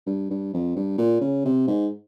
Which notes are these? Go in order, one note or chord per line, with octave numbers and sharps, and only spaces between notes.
G2
G2
F2
G2
A#2
C#3
C3
G#2